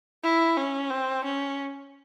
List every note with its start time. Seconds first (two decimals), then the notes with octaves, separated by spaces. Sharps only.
0.24 E4
0.57 C#4
0.90 C4
1.25 C#4